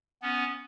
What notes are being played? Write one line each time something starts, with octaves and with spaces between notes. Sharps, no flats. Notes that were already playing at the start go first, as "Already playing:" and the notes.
B3 C#4